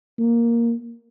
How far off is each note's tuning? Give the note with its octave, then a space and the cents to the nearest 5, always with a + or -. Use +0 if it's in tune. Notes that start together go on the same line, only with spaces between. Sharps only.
A#3 +5